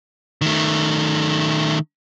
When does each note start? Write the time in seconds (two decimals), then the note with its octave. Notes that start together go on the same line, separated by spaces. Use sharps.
0.41 D#3 A3